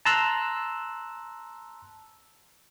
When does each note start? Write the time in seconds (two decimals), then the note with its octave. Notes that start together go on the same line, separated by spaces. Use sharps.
0.05 A5 A#5 C6 E6 F#6